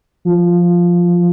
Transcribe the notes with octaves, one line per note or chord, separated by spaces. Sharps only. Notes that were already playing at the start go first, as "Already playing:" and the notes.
F3